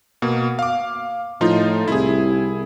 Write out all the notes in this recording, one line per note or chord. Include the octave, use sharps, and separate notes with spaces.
B2 A#3
F5 D6
A2 F3 D#4 F4
C2 E4 G#4